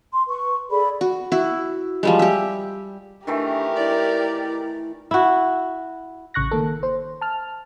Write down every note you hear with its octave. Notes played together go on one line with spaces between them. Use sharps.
C6
B4 C#6
G#4 A4 D5 B5
F#4
E4 F#4
F3 G3 G#3
G4 E5
D#3 E3 A3 D4 G4 A#4
E4 D5
E4 F#4
A1 C#3 C#6 F#6 A#6
D#3 A#3 A4
C5
A5 F6